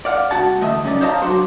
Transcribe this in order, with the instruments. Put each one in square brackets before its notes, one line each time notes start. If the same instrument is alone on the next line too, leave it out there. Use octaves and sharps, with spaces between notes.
[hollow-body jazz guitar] D5 F5 F#5
C2 F#4 F#5 A5
E2 D3 A3 D#5 E5
F#2 C#3 C#4 D#4 D5
C5 C#5 D#5 F5 A5 A#5
F#3 D4 F#4 C5